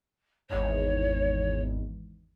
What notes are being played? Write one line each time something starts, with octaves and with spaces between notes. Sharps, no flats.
G#1 E2 G#2 C#5